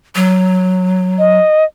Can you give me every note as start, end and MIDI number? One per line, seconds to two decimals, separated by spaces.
0.15 1.38 54
1.19 1.64 75